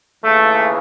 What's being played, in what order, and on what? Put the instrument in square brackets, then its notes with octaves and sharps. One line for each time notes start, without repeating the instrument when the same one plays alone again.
[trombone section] D#2 C#3 E3 A3